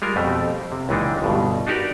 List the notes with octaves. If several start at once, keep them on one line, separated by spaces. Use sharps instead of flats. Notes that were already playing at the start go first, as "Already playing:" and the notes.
G3 G#3 F4 A#4
F2 B2 G3 A3
C3
C#2 A#2 E3 G#3 D4 D#4
G1 G2 B2
D4 D#4 F#4 G4 A#4 D5